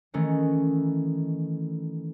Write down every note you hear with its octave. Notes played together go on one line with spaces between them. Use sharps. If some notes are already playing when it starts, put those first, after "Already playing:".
D#3 E3 A3 C#4 D#4